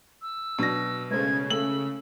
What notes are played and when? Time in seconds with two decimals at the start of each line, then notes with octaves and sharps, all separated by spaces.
0.22 E6
0.58 B2 F#3 D4 A#6
1.11 C#3 G#3 A3 C5 G#6
1.50 A3 E6 F#7